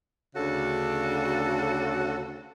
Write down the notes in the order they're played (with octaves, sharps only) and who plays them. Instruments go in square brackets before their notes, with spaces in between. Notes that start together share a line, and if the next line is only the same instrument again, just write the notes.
[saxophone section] D2 C#3 D4 F#4 A4